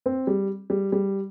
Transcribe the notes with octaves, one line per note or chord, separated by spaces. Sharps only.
C4
G3
G3
G3